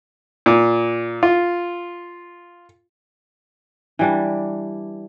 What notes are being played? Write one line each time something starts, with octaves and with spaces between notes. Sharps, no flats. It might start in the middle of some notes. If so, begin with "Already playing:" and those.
A#2
F4
E3 G3 D4